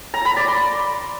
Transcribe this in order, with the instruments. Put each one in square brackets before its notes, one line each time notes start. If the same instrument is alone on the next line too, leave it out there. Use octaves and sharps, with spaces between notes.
[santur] A#5
B5
D5
C6